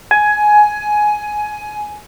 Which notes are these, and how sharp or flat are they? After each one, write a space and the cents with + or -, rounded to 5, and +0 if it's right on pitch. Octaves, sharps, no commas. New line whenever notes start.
G#5 +15